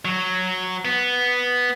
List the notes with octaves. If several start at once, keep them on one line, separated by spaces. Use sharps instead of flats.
F#3
B3